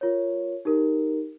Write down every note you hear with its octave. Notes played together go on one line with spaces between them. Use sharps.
F4 A#4 C#5
D#4 G4 A#4